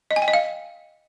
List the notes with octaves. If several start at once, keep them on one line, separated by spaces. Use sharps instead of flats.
D#5
G#5
G5
D#5
F5